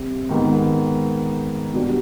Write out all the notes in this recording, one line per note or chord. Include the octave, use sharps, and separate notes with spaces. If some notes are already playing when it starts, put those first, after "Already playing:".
Already playing: C3 G3 C4
G#2 D#3 B3
B2 G3 D4 G4